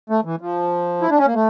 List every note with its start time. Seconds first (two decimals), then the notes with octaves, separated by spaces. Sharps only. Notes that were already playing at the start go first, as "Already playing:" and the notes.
0.10 A3
0.25 E3
0.41 F3
1.02 E4
1.10 D4
1.18 C#4
1.26 A#3
1.34 A3